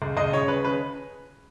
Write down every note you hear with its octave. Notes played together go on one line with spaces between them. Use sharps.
C#2
C#2 D#5
C#3 C#5
C#3 B4
C#3 B4